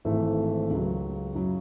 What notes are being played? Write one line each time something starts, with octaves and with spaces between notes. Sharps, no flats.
G#1 G#2 E3 A3
C#2 C#3 F#3
F#2 C#3 F#3